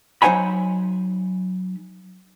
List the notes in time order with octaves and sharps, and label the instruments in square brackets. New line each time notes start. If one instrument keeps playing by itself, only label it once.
[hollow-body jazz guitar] F#3 D#4 C5 F#5 G#5 B5